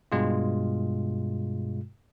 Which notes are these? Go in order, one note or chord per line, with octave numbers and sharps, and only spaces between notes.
G2 B2 G#3 F4